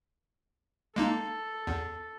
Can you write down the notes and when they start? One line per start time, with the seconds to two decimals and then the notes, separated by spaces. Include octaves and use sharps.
0.96 G#3 A#3 D#4 A4
1.67 E2